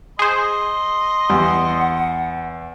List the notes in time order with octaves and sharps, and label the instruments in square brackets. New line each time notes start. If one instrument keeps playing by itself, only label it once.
[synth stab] G#4 C5 [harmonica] D#5 C6
[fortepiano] E2 [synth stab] G3 [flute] F#5